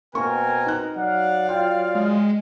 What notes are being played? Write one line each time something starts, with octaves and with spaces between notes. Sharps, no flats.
B2 A#3 C4 A#4 G#5 C#6
D#4 F#6
F#3 D5 F5 F#5
F4 G5
G#3